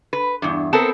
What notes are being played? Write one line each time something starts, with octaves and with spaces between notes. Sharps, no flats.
B4
E2 G2
B3 C4 A4 A#4